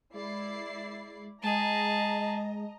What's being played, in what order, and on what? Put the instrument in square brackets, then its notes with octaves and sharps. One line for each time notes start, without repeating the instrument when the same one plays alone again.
[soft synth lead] G#3 [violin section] E4 D5 C7
[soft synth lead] G#3 [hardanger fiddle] G#4 A5 [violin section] D#5 A#5